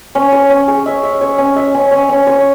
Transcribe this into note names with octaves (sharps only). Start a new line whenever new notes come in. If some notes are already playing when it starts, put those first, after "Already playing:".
C#4
C#5
C#4
G#4
E5
E5
C#5
C#4
E5
C#4
C#4
C#4
C#5